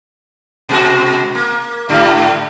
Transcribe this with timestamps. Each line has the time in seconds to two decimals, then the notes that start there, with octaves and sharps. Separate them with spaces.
0.69 B2 G#3 F#4
1.35 A#3
1.89 G#2 D3 G3